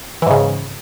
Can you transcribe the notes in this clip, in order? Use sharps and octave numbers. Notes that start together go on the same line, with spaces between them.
G#2 C#3 E3